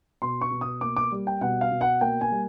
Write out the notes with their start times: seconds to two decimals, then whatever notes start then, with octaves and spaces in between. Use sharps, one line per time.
0.22 B2 C6
0.41 C#6
0.51 B2
0.61 D#6
0.81 A#3 D6
0.97 D6
1.12 G3
1.27 G5
1.41 B2 F#5
1.61 F5
1.72 B2
1.81 F#5
2.01 A#3 G5
2.21 G#5
2.31 G3